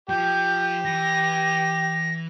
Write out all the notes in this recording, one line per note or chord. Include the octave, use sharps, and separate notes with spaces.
F3 G4 G6
E3 A#6